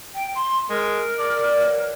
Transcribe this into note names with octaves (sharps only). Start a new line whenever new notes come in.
G5
C6
G#3 A#4
G#4 D5
D3 G4
E3 F#3